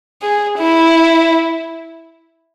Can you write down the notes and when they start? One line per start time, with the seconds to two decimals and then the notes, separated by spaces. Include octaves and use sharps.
0.22 G#4
0.58 E4